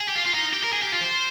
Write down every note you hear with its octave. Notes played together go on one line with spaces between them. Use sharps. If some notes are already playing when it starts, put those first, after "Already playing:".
G#4
G4
F4
F4
D#4
G4
A#4
G#4
G4
F4
C5